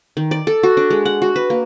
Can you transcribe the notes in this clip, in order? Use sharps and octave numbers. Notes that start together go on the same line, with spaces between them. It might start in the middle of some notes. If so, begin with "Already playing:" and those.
D#3
D5
A4
F#4
D4
G#3
F#5
F#4
B4
A#3